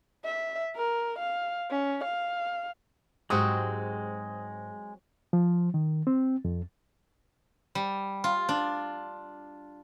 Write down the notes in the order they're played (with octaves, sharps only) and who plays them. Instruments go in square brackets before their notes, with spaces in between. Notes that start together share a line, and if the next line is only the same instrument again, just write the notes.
[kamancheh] E5
A#4
F5
C#4
F5
[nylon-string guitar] G#2 G4 [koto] F#3 C4 F#4 [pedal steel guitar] G#3 [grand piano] D#6
[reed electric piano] F3
D#3
C4
F2
[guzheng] G3
F4
D4